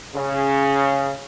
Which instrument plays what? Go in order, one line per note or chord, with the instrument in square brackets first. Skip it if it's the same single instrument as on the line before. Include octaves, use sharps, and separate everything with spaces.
[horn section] C#3